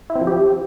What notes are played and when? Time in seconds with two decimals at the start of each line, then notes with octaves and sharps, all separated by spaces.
0.10 E4
0.16 C4
0.21 F3
0.27 G4